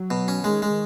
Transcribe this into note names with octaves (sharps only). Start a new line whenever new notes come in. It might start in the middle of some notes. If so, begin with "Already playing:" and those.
Already playing: F#3
B2
C#4
D#3 G#3
G#3